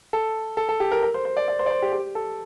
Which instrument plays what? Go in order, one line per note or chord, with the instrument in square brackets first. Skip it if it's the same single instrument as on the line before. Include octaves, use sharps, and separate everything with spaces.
[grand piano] A4
A4
A4
G4
A#4
A#4
C5
C5
D5
D5
C5
D5
C5
G4
G4
A4